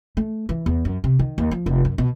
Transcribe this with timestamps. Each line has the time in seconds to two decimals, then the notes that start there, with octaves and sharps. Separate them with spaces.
0.17 A3
0.49 E3
0.66 E2
0.85 F#2
1.04 C3
1.19 D#3
1.38 D#2
1.51 F3
1.66 F1
1.85 F#2
1.98 B2